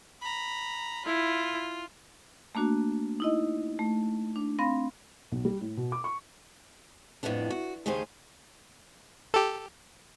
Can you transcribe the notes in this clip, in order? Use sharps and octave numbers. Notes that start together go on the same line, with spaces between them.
A#5 B5
E4 F4
A3 A#3 D4 F#4
D#4 E4 D#5
A3
D4
C4 F5 B5 A#6
B1
G3
A2
B2
D6
C#6
F2 A2 G3 B3 D4
F#4
D#2 C#3 A3 G4 G#4 C5
G4 A4